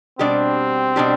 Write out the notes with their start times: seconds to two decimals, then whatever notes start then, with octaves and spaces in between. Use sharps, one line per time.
0.19 B2 G3 C4 D4 G4
0.96 B2 G3 D4 G4